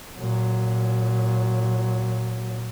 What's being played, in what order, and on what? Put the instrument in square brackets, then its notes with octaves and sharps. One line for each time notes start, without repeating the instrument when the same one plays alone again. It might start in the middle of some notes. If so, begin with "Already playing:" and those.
[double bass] A#2 F#3